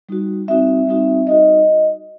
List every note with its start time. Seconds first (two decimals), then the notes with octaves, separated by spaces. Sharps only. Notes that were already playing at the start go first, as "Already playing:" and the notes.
0.09 G3 D#4 F#4
0.48 G3 C4 D#4 F#4 E5
0.87 G3 C4 D#4 F#4
1.27 G3 D#4 F#4 D#5